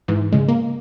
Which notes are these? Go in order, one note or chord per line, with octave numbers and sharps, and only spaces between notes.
G#2 E3
C#3 G#3
A#3